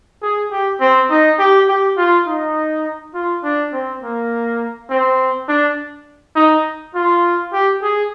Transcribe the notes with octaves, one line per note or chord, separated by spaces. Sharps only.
G#4
G4
C4
D#4
G4
G4
F4
D#4
F4
D4
C4
A#3
C4
D4
D#4
F4
G4
G#4